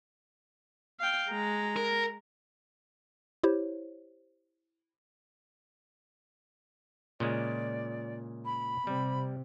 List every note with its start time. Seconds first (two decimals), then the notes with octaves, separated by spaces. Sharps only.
1.00 F5 G5
1.30 G#3 A#5
1.76 A#4
3.43 E4 G4 C5 C#5
7.20 A#2 C#3 G#3 D5
8.45 B5
8.87 C3 G3